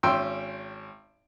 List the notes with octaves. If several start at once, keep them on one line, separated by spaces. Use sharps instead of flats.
G#1 C#4 G5 C6 E6